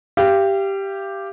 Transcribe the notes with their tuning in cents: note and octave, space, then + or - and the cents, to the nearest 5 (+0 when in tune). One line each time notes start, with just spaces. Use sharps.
G4 +0 F5 -35